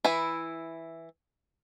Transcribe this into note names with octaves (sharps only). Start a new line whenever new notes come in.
E3 E4